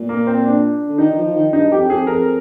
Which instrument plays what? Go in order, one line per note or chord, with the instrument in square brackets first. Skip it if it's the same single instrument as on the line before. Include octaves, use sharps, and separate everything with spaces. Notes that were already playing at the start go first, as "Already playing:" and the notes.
Already playing: [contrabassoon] A#2
[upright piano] A#3
C4
D4
[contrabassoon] D3
[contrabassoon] D#3 [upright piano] D#4
[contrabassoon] D#3
F3
D#3
[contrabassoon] G2 [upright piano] D#4
[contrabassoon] F2 [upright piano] G4
[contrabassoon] F2 [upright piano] G#4
[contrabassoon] F2 [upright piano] A#4